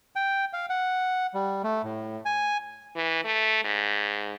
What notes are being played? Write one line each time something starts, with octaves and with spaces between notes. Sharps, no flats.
G5
F5
F#5
G3
A3
A2
G#5
E3
A3
G#2